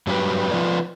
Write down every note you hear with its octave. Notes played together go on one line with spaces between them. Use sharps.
G2 F#3 G3 C#4 G4 B4
F3 F4 B4 D5